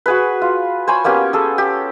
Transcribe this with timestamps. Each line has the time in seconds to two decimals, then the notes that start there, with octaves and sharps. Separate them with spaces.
0.06 F#4 G#4 B4
0.42 F4
0.87 C5 C#5 G#5 B5
1.04 A#3 B3 C#4 G4
1.33 G#4 A4
1.58 G4